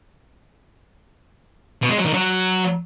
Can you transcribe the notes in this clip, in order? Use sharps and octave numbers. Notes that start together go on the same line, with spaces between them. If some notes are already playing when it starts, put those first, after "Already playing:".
B2
G#3
F#3
D#3
F#3